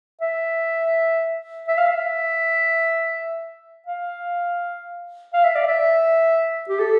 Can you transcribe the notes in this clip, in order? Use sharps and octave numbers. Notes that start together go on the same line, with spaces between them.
E5
E5
F5
E5
F5
F5
E5
D5
E5
G4
A4